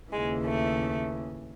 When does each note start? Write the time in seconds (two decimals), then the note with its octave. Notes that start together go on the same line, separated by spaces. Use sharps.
0.12 D#2 C#3 E3 G#3
0.45 A3